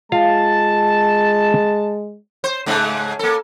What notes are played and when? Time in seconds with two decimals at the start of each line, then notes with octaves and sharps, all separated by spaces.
0.12 G#3 F4 F5 A5
2.44 C5
2.66 G#2 C#3 G#3
3.19 A#3 A4